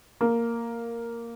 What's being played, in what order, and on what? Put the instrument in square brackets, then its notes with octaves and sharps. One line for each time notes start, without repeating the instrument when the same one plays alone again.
[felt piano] A#3